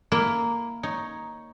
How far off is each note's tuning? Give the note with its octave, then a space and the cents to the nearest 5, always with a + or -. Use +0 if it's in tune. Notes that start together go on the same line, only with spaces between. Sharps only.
A#3 +0 E4 +0
D#4 +5 C#5 +0